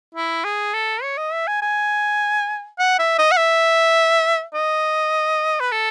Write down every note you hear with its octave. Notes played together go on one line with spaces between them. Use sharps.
E4
G#4
A4
C#5
D#5
E5
G#5
G#5
F#5
E5
D#5
F#5
E5
D#5
B4
A4